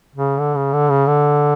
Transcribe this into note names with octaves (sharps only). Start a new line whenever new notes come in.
C#3
D3
C#3
D3
C#3
D3